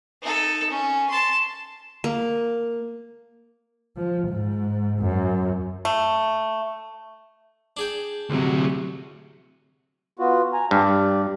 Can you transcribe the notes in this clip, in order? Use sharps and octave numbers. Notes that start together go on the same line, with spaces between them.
D#4 A4
C#4
A5 C6
A#3
F3
G#2
F#2
A3
D4 G#4 G5
D2 C3 F#3
B3 F4 F#4
G#5 A#5
G2 G4 D5